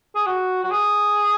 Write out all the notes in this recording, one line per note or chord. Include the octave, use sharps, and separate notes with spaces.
G#4
F#4
F#4
G#4